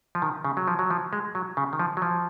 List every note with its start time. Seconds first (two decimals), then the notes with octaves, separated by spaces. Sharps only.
0.15 F3
0.22 D#3
0.45 C#3
0.57 F#3
0.68 F3
0.79 F#3
0.90 F3
1.13 G#3
1.35 F#3
1.57 C#3
1.73 D#3
1.79 F3
1.97 F#3
2.02 F3